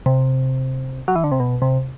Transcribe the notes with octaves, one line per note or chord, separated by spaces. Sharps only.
C3
F#3
E3
D3
C3
B2
C3